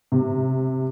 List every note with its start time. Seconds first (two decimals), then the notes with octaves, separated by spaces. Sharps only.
0.12 C3